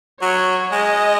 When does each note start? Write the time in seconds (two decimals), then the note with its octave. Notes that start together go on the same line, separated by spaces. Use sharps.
0.22 F#3 C#5
0.72 G#3 D#5